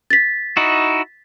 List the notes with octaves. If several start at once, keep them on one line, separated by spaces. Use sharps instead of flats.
A6 B6
D#4 E4 F#4